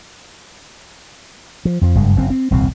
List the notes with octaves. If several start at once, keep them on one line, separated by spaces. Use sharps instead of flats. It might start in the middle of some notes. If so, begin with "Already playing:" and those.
F3
F2 F3
F#1 G2 G#3
F#1 F#2 F#3 C4
C4
D#1 C2 F2 C4